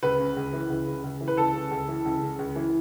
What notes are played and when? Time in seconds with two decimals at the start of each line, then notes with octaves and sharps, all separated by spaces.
0.03 C#2 B4
0.19 C#3
0.37 C#2
0.53 E3
0.70 C#2
0.87 C#3
1.04 C#2
1.21 E3
1.28 B4
1.37 C#2 A4
1.54 C#3
1.71 C#2
1.88 E3
2.05 C#2
2.22 C#3
2.39 C#2
2.56 E3